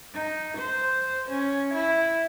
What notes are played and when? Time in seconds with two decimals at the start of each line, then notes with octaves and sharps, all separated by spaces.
0.13 D#4
0.57 C5
1.30 C#4
1.74 E4